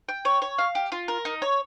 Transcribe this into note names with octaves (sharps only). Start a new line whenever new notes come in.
G5
C#5
C#5
F5
G4
F4
A#4
D#4
C#5